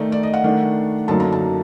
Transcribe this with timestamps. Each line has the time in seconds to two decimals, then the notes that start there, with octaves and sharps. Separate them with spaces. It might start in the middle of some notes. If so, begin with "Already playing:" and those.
Already playing: D#3 A3 D#4 D5
0.12 D5
0.23 D#5
0.34 F#5
0.44 D#3 A3 D4
1.08 F#2 D3 F#3 A#3 D#4 A5
1.20 A#5
1.32 A5